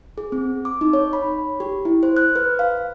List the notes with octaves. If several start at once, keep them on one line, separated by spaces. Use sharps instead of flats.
G#4
C4
D6
D#4
C#5
B5
G4
E4
C5
F#6
B4
F5